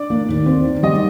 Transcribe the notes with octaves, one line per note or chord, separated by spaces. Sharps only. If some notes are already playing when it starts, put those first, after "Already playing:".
Already playing: D4 D5
A#3
D#2
C4
D#3
G3 D#5